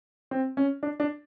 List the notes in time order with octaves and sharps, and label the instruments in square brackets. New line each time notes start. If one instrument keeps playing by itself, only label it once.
[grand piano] C4
C#4
D4
D4